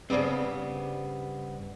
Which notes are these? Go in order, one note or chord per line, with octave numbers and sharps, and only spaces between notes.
G2 C#3 G3 B3 C4